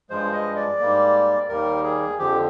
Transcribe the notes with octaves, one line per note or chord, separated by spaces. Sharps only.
G2 F3 G#3 C5
D#5
D5
G#2 G3 A#3
D#2 D#3 G3 A#3 A#4
G#4
F2 D3 F3 G4